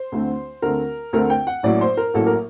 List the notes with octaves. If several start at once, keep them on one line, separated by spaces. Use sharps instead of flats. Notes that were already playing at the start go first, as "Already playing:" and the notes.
Already playing: C5
D2 D3 A3 C4
D2 D3 A3 C4 A#4
D2 D3 A3 C4 A#4
G5
F#5
A1 A2 F#3 A#3 D5
C5
A#4
A1 A2 F#3 A#3 A4
A#4